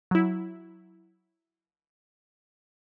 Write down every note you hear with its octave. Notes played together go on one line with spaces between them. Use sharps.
F#3 E4